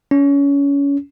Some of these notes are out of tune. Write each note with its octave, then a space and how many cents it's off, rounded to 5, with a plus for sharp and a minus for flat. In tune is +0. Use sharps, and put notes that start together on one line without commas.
C#4 +25